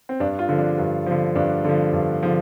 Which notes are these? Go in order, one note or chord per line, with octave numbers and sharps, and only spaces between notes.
C4
G2 D4
F4
D3 F3
D4
G2
D3 F3
G2 D4
D3 F3
G2
D3 F3